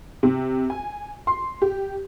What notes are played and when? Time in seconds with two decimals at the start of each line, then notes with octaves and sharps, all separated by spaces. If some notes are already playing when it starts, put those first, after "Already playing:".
0.23 C3
0.70 G#5
1.27 C6
1.62 G4